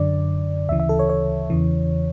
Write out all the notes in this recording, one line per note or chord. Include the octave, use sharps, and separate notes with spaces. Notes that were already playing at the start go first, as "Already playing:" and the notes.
Already playing: F#2 D3 D5
D2 C#3 E3 E5
E5
A4
C#5
C#5
E2 C#3 E3